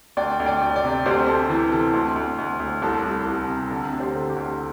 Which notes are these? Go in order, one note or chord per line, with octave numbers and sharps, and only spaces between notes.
D2 D5 G5
D2
D5 G5
D2
D5 G5
C3
D2 G4 C5
D2 A4
E3 A4
C3 A4
D2
D2
D2
D2
C2 A4
C2
C2
C3
D3 A4
D2
G4 C5
D3
G4
D2